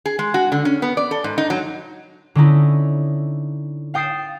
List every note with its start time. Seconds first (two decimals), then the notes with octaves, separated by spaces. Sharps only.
0.06 G#4
0.19 G#3
0.34 F#4
0.52 D3
0.65 C#4
0.82 B3
0.97 D5
1.11 A4
1.24 G#2
1.38 D#4
1.50 F#3
2.35 D3 C#4 D#4 E4
3.94 F5 G5 D#6 A6 C7 E7